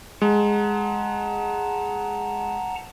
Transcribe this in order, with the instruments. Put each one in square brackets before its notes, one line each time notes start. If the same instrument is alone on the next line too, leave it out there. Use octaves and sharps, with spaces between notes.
[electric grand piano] G#3 [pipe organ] F#5 A5 A#5